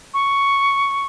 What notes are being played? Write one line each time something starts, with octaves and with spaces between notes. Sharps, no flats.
C#6